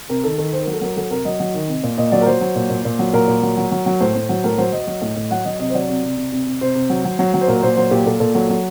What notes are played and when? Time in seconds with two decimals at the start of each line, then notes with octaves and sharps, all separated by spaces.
0.09 C3 A#4
0.24 D#3 A4
0.38 D#3 A4
0.53 D#3 C5
0.63 F#3 A#4
0.73 A4
0.81 F#3 A#4
0.96 F#3 A4
1.11 C3 A#4
1.25 F#3 D#5
1.40 F#3
1.54 D#3
1.68 C3
1.83 A#2
1.97 A#2 D#5
2.12 F#3 D5
2.21 A#4
2.26 F#3 C5
2.41 F#3
2.55 A#2
2.70 A#2
2.85 A#2
2.99 F#3
3.13 A#2 A#4
3.28 A#2
3.43 F#3
3.57 F#3
3.71 F#3
3.86 F#3
4.00 A2 C5
4.15 A2
4.29 F#3
4.44 A2 A#4
4.58 F#3 C5
4.73 F#3 D#5
4.87 F#3
5.02 A2
5.16 A2
5.31 F#3 F#5
5.45 F#3 D#5
5.59 C3 D#5
5.70 C5
5.74 F#3 D5
5.89 C3
6.03 C3
6.17 C3
6.32 C3
6.47 C3
6.61 C3 C5
6.75 C3
6.90 F#3
7.05 F#3
7.19 F#3
7.34 F#3
7.41 C5
7.48 A#2 A#4
7.63 A#2 C5
7.77 F#3 C5
7.91 A#2 G4
8.06 A#2 A4
8.20 A#2 A4
8.35 F#3 A4
8.49 F#3